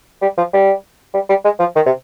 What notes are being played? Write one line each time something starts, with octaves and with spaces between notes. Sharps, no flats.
G3
F3
G3
G3
G3
G#3
F3
D#3
C3